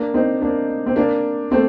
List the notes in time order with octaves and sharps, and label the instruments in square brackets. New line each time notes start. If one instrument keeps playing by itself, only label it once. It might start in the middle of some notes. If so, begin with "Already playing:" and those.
Already playing: [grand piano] A#3 D4
C4 D#4
A#3 D4
C4
A#3 D4
A3 C4